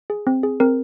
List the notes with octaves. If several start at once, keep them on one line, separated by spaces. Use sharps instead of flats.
G#4
C4
G#4
C4 A#4